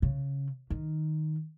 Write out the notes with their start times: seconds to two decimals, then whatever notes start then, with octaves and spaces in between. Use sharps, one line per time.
0.02 C#3
0.70 D#3